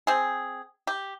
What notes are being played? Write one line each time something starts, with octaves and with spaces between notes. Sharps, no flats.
C4 G#4
G4